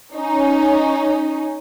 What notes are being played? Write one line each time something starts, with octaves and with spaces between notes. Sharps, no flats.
C#4 D#4